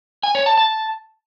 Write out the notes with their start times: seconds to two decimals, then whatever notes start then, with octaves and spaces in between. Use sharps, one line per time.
0.23 G#5
0.35 C#5
0.46 A5
0.58 A5